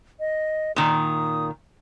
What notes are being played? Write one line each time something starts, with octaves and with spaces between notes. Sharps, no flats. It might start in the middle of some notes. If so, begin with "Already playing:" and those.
D#5
A#2 D#3 D#6